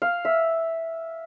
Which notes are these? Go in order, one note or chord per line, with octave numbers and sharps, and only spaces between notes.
F5
E5